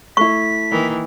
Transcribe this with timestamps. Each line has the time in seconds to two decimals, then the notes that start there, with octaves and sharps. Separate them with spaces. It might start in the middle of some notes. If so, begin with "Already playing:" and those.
0.17 A3 E4 C#6 B6
0.71 D#3 E3 A#3